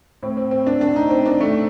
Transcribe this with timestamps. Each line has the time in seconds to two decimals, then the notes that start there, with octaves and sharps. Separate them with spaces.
0.23 A2 C4
0.37 C4
0.51 C4
0.67 D4
0.81 D4
0.96 D#4
1.11 C4
1.26 D4
1.41 A3